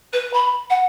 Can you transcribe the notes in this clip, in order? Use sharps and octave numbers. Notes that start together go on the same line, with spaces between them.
B4
B5
F#5